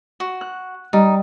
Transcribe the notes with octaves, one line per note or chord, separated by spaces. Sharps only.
F#4
F#6
G3 D#4